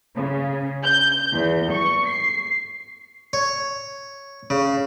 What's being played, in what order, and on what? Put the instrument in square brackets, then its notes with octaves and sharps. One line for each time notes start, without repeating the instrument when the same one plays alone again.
[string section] C#3
G6
E2
C#6
C7
[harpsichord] C#5
C#3